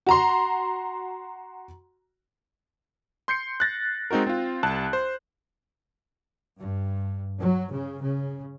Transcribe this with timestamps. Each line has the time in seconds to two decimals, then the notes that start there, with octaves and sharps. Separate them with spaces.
0.07 F#4 A#5 C6
3.28 C6 G6 C7 C#7
3.60 F#6 A6 A#6
4.11 G#3 C4 D#4 F#4 A#4
4.27 C4 F4
4.63 C2 A5 F#6
4.93 C5
6.59 G2
7.38 F#3
7.71 C#3
8.02 C#3